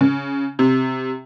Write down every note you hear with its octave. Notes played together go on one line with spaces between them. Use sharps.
C#3
C3